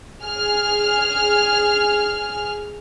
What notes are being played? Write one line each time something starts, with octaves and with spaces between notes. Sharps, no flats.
G#4 F6